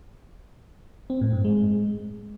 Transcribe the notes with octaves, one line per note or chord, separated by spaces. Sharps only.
C4
A2
G2
G#3